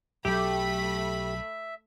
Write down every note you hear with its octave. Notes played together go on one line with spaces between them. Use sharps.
B1 F#3 A3 G4 E5 B5 B6